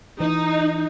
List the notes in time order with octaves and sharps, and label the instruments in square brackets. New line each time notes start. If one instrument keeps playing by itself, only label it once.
[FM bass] E3 [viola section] D#4